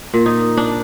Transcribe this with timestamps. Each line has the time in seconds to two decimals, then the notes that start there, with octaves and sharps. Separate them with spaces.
0.14 A#2
0.26 D#4
0.57 D4